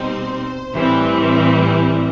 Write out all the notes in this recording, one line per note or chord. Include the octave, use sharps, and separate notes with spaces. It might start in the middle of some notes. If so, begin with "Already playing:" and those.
Already playing: B2 G3 C4 D#4 C5
A2 E3 G3 C4